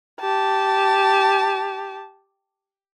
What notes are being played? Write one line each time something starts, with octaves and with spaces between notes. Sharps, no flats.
G4 A5